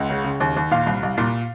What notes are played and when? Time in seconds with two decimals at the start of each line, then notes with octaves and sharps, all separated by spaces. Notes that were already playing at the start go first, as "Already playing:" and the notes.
Already playing: C#2 F#5
0.10 C#3
0.24 C#3
0.40 D#2
0.56 D#2
0.71 A#2 F5
0.86 C2
1.03 C2
1.18 A#2